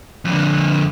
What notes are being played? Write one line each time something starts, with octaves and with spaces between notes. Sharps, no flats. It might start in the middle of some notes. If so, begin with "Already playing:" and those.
F2 D3